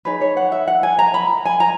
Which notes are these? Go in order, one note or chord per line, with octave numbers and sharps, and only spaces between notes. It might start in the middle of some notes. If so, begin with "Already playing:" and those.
D#4 G#4 B4 C#5
C#5
F#5
E5
F#5
G#5
A#5
B5
G#5
A#5